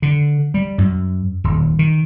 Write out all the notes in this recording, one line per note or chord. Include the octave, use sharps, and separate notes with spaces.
D3
G3
F#2
D#1
D#3